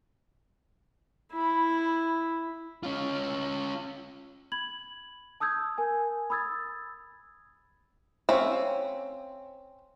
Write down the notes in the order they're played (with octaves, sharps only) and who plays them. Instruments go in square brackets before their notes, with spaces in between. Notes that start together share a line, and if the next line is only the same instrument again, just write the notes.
[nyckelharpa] E4 [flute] B5
[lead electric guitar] C#4 F4
[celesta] B5 G#6 F#7
A5 D#6 E6 G6 G#6
A#4 G#5
B5 D#6 E6 G#6 A6
[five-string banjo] C4 C#4 E5 F5